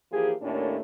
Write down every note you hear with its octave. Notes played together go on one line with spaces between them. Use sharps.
E3 F3 A#3 G4 G#4
D#2 A2 A3 A#3 C#4 D4